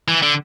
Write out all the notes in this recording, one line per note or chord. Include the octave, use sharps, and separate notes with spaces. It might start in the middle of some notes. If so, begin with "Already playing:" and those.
E3
D3